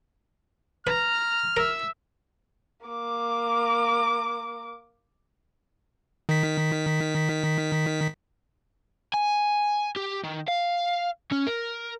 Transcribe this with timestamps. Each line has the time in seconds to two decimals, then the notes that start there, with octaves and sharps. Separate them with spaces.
0.87 B4 A#5 F6
1.57 A#4 E5 E6
2.86 A#3 D6
6.29 D#3 B6
9.14 G#5
9.97 G4
10.24 D#3
10.48 F5
11.32 C#4
11.47 A#4